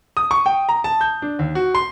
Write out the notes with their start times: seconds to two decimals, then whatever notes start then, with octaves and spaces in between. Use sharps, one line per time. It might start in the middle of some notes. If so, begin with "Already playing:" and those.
0.17 D#6
0.31 C#6
0.46 G5
0.69 A#5
0.84 A5
1.01 G6
1.22 D4
1.39 D#2
1.55 F#4
1.75 C6